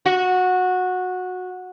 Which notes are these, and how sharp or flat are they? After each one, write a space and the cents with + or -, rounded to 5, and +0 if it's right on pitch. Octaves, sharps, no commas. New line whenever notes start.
F#4 -15